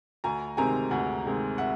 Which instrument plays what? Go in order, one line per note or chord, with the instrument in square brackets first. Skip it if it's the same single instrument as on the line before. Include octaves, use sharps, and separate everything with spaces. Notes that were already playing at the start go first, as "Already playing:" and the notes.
[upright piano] D2 G#5 A#5
C3 D#3 G#3 C4 G#5 A#5
D2 F#5 G#5
C3 D#3 G#3 C4
E5 F#5